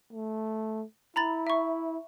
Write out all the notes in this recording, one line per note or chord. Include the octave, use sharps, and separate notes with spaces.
A3
E4 A#5 B5 A6
E5 C#6